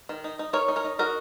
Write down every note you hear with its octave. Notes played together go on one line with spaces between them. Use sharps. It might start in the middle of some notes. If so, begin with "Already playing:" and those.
D#3
D#4
D#4
D#4 A#4 C#5
D#4
A#4 C#5
D#4
D#4 F#4 A#4